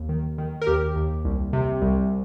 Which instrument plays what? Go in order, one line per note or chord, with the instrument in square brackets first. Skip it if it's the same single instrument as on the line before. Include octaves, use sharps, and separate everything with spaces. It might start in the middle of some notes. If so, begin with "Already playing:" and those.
Already playing: [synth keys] D#2
D#3
D#3
A#4
D#2 G4
D#2
C2
C3
C2